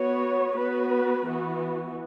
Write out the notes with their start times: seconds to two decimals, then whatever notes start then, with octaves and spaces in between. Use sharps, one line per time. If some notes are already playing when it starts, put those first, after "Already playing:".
Already playing: B3 F#4 C#5
0.57 B3 F#4 B4
1.26 E3 B3 F#4